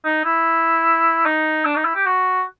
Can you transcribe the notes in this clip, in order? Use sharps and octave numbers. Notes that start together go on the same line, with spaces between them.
D#4
E4
D#4
D4
D#4
E4
G4
F#4